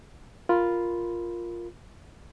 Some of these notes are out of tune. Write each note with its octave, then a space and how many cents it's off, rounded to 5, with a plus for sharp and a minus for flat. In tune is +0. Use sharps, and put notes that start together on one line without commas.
F4 +0 A#4 +0 B5 +0